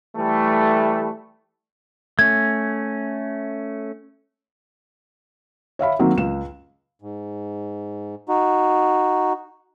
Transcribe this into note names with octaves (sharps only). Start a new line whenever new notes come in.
E3 G3 A3
A3 C#4 G#6
C#5 E5 F5 B5
D#3 F#3 A#3 C4 A#4
C#2 E7
G#2
D#4 F#4